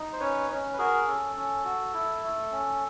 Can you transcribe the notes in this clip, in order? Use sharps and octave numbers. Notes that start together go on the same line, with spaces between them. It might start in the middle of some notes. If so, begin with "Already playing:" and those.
Already playing: D#4
C5
C#4 B4 C#5
C#4
B4
F#4 G#4 A#4
C#4 A4
C#4
F#4
E4
A3
C#4